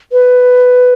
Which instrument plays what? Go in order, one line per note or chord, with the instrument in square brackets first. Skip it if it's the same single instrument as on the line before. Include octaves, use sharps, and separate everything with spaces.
[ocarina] B4